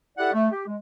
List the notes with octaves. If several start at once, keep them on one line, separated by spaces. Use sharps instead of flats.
E4 G4 A4 D5 E5 F#5
A3
G4
G#3